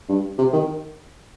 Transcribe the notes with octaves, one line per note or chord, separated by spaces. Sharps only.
G2
C3
D#3